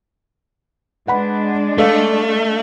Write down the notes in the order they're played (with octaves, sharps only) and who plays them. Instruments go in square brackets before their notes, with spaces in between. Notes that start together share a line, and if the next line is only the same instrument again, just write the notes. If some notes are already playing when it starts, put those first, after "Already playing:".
[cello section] G#3 D4 [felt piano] B4 F#5 B5
[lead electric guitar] A3 [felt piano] A4 D#5 F5